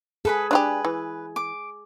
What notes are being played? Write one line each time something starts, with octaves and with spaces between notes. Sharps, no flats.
G#4 A4 B4 B5
D4 F4 G4 B4
E3
D6